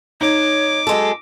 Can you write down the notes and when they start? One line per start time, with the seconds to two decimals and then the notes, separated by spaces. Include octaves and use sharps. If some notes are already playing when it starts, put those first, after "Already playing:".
0.21 D#4 C#5 D6
0.87 F#2 G#3 A4